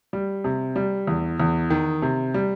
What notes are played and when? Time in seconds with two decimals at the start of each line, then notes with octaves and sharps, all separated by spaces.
0.13 G3
0.44 C3
0.76 G3
1.07 E2
1.40 E2
1.70 D#3
2.02 C3
2.34 G3